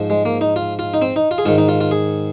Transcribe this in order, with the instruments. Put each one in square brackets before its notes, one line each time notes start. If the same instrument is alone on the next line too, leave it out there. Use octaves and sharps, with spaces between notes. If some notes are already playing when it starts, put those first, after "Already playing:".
Already playing: [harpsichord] G#2 F3
G#3
A#3
D#4
F4
F4
D#4
C4
D#4
F4
G#4
G#2 D#3 F4
D#4
F4
F4
G#4